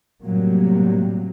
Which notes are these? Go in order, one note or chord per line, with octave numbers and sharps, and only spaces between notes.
A2 C3 F#3 G3 A#3